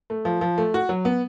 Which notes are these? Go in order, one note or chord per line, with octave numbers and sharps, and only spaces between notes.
A3
F3
F3
A3
F#4
F#3
B3